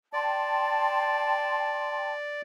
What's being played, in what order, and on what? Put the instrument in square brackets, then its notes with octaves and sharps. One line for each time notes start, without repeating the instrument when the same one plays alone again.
[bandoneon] D5 [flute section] G5 A5 C6